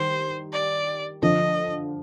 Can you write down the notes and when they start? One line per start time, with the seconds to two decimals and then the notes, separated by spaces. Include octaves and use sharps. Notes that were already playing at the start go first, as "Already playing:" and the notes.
Already playing: D#3 G3 C5
0.52 D5
1.22 D3 F3 D#5